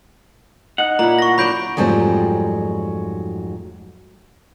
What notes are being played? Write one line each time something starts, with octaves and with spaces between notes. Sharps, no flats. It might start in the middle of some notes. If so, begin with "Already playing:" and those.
D#4 F#5
A#2 E4 A#5
C#6 A#6
F#3 D4 B5 G6 D7
F2 G#2 F#3 G3 A3 C4